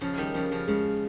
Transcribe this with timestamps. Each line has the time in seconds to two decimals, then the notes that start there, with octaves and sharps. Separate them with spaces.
0.01 C#3 F3 C#4
0.17 D#3 G3
0.34 C#3 F3 C#4
0.51 C#3 F3
0.68 C#3 G#3